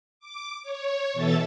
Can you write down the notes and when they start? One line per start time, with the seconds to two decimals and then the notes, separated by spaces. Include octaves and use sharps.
0.20 D6
0.63 C#5
1.14 B2 E3 A4 E5 A6